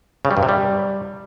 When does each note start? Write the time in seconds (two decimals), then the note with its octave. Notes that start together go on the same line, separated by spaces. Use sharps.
0.25 C#3
0.31 G3
0.37 G2
0.43 C3
0.49 G3